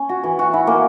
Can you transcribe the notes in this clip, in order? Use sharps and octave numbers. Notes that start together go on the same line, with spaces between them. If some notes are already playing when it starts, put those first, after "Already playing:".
Already playing: C#4
F#4
E3
F#4
E4
A#3